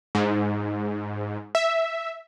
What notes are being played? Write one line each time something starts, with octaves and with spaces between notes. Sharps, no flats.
G#2
E5